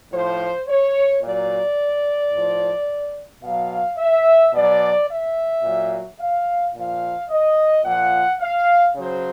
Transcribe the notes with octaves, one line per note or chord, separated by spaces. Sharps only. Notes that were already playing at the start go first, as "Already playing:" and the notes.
A2 F3 C5
C#5
A#2 F#3 D5
A2 F3
B2 F#3 F5
E5
B2 F#3 D5
E5
A#2 F#3
F5
A#2 F3 F5
D#5
A#2 F3 F#5
F5
C#3 F#3 C5